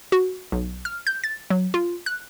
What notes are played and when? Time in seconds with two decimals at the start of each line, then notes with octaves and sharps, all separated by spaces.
0.12 F#4
0.52 B1
0.85 F6
1.07 G6
1.24 A6
1.50 F#3
1.74 F4
2.06 F#6